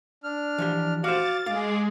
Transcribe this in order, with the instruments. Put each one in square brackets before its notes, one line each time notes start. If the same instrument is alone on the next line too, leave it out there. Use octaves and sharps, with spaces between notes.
[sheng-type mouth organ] D4 F6
[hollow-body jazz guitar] E3 F3 G4
[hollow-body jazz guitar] F#4 C5 [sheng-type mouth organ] F5 D6 [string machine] A6
[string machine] G#3 G#4 [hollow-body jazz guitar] F5 [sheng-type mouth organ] D6